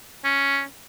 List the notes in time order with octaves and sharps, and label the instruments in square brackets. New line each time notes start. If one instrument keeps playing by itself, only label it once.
[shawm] C#4